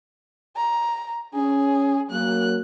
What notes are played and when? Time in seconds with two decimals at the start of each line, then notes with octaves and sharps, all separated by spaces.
0.56 A#5
1.34 C#4 G#4
2.11 F#3 A#3 F#6